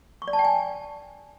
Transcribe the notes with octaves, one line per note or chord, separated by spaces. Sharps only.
C#6
D5
A5
G5
G#5